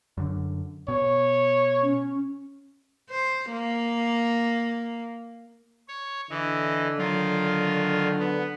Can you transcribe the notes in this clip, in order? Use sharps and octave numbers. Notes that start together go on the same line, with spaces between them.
F#2 D3
B2 C#5
C#4
C5
A#3
C#5
D3 E3 D#5
D#3 F#3 F4
B3